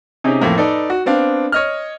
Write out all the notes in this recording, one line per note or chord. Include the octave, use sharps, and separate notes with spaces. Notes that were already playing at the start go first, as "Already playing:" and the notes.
C3 C#4 D#4 G4 G#4
F2 A2 F3 A#3
D#4 A4 B4 D5
F#4
B3 C4 D4 F5
C#5 D#5 F6